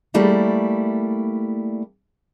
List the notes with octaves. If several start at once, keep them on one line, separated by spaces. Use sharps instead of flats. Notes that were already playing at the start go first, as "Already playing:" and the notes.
G3 A3 A#3 E4